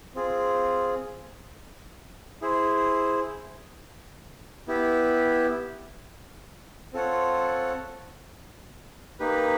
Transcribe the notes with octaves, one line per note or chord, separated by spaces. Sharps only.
C4 F4 G#4
E4 G#4 C5
B3 E4 G4
C4 F4 A4 C#5 F#5
A#3 D#4 G4 B4